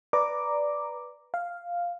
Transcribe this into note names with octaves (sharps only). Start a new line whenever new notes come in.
B4 D5 A#5 D6
F5